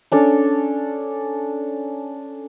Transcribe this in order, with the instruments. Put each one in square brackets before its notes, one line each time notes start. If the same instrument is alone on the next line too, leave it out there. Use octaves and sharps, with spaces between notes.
[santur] C#4 D4 A4